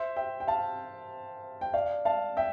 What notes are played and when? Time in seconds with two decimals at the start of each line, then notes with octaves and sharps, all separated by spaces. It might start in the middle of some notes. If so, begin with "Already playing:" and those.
Already playing: C5 E5
0.16 E5 G5
0.40 G5
0.47 F5 A5
1.61 G5
1.74 D5 F5
2.05 F5 A5
2.37 E5 G5